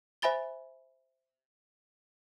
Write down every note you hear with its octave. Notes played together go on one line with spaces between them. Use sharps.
C5 E5 G#5 B5 A6 G7